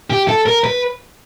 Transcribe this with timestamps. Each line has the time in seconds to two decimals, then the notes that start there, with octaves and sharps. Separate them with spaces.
0.10 G4
0.28 A4
0.46 A#4
0.64 B4